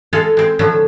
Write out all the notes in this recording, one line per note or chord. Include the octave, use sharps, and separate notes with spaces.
G#3 F4 A4
G#3 C4
A2 D3 F3 F#3